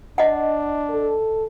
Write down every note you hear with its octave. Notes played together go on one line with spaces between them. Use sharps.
D4 D#5 F#5
A4